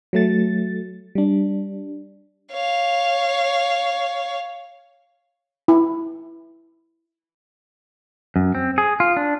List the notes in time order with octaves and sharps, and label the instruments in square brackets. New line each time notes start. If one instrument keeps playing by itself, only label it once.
[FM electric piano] F#3 A3 A6
G3 D4
[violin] C#5 F5
[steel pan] E4
[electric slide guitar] F#2
C4
G#4
F4
D4